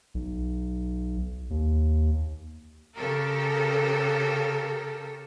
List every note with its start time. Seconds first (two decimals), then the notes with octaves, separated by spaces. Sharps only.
0.15 B1
1.50 D#2
2.96 C#3 G4 A4 A#4